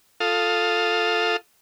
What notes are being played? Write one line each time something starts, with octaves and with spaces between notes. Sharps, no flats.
F4 A4 F5 D#6